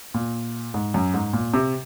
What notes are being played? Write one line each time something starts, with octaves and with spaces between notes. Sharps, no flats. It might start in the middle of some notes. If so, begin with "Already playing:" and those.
A#2
G#2
F#2
G#2
A#2
C3